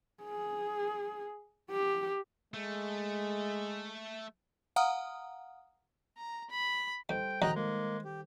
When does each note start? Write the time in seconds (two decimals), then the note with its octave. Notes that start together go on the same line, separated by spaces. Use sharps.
0.23 G#4
1.71 G4
2.54 G#3 A3
4.76 F5 F#5 A#5 D#6 F6
6.17 A#5
6.50 B5
7.09 D#2 G3 A4 C5 G5
7.42 A#1 D#2 D#3 F#3 D#5 G5 A#5 F#6
7.55 G#3 A#3
8.05 G4